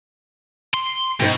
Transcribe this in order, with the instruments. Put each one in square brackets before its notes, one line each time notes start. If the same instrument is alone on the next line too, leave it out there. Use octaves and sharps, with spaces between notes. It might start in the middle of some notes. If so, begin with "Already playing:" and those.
[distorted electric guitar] C6
[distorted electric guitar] B2 [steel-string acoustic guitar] D#4 C5 G5